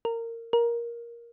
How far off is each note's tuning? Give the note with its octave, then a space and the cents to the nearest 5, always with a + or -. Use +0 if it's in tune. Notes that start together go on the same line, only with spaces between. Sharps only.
A#4 -20
A#4 +10